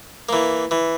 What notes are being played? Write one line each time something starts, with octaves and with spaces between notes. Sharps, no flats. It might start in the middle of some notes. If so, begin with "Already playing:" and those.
E3 A#3
E3